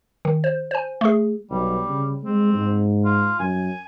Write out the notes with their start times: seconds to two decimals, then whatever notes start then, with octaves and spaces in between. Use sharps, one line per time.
0.25 D#3
0.44 C5
0.71 C5 G#5
1.01 A3 G#4
1.51 B1 G3
1.89 C#3
2.23 G#3 C4
2.54 G#2
3.05 F4
3.40 F#2 G#5